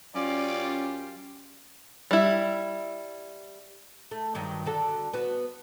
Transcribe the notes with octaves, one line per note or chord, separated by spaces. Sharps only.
F#2 C#4 F4 G4 D5
G3 E4
A3
G2 D#3 F#3
D3 F#4 A4
B3 F#4